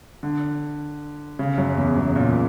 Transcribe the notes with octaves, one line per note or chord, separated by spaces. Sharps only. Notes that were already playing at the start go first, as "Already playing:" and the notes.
D3
C#3
F#2
E2
F#2
A#2